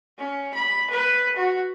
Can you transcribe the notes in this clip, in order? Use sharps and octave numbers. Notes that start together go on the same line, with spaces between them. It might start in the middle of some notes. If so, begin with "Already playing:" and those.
C#4
B5
B4
F#4